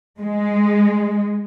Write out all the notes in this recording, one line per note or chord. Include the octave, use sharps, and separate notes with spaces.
G#3